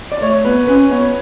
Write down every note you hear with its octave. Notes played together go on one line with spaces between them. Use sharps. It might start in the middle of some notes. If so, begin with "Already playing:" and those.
D5
A3 C#5
B3 B4
C#4 B4
B3 C#5